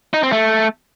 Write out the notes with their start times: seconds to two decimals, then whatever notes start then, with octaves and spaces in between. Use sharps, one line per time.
0.14 D#4
0.23 C4
0.32 A3